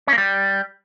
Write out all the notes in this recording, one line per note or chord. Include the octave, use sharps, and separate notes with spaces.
C#4
A#3
G3